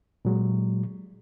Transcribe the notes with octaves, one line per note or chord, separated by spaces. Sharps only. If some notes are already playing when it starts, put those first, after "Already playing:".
A#2 F#3 G#3